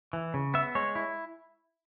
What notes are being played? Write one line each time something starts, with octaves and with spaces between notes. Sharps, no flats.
E3
C#3
B3 E5
G#3 C#5
E4